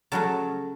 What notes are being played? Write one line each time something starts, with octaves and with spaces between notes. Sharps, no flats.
C#3 F#3 A3 A5